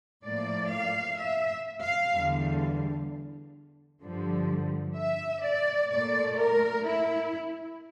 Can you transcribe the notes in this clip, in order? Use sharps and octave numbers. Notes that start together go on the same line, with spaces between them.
A2 F3 A#3 D5
F5
E5
F5
E2 D3 G3
G2 D3 F3
E5
D5
A#2 A3 D5
A#4
E4